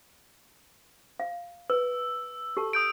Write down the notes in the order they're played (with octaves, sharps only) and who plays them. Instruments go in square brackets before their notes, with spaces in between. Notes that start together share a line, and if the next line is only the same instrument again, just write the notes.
[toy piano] F5
[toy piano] B4 [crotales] E6
[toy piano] G4 A4 A5
[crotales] D#6 G6 D7